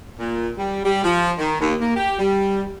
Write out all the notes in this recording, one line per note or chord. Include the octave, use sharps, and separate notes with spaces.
A#2
G3
G3
F3
D#3
D#2
A#3
G4
G3